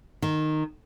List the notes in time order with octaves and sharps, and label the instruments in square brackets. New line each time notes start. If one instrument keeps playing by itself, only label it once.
[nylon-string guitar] D#3